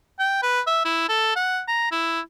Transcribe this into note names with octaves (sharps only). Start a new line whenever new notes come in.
G5
B4
E5
E4
A4
F#5
A#5
E4